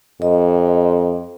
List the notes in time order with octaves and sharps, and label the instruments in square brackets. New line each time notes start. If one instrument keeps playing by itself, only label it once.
[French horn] F2 [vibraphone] D#5